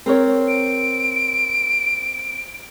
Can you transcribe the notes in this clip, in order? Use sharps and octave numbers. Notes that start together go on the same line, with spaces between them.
C4 A#4 C#5
D7